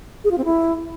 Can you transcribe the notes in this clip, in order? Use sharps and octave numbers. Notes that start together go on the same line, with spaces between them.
G#4
F4
C4
E4